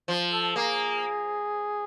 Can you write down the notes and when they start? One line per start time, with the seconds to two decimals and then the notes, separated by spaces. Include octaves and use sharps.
0.08 F3
0.32 A4
0.56 A#3 G#4